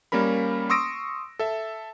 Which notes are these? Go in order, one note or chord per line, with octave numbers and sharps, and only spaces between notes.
G3 A#3 C#4 A#4 B5
C6 C#6 D#6 E6 A#6 D7
A4 E5